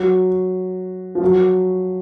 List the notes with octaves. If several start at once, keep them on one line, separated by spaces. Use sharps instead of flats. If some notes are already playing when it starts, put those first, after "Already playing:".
Already playing: F#3
F3
F#3